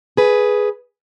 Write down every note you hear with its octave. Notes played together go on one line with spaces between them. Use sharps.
G#4 B4